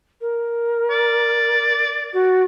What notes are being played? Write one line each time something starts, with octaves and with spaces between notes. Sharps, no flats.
A#4
D5
F#4